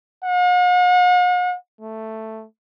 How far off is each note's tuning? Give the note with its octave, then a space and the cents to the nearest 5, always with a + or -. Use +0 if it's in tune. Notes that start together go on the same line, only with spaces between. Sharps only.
F#5 -45
A3 +5